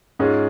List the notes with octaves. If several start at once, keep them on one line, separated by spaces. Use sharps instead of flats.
G#2 G#3 C#4 F4 G#4